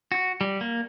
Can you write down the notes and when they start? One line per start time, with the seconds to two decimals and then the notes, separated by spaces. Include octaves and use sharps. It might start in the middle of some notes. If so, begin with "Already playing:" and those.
0.12 F#4
0.41 G3
0.61 A#3